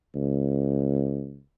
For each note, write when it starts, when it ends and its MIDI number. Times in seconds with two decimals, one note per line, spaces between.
0.15 1.40 37